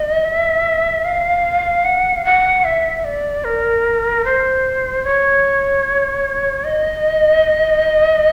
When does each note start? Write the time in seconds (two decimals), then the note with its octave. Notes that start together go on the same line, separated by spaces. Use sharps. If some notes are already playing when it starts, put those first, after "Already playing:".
Already playing: D#5
0.25 E5
1.05 F5
1.85 F#5
2.17 F5
2.25 F#5
2.65 E5
3.05 D5
3.44 A#4
4.25 C5
5.04 C#5
6.64 D#5